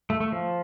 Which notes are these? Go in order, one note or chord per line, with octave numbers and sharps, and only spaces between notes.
A3
A3
F3